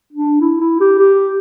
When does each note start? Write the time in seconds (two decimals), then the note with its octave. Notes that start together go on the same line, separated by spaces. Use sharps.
0.12 D4
0.41 E4
0.60 E4
0.80 G4
0.99 G4